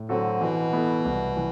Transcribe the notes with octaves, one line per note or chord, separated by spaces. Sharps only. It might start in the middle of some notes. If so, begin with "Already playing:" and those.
Already playing: A2
D3 F#3 C4 F#4 A4
B2 E3
B3 E4 A4
C2
E3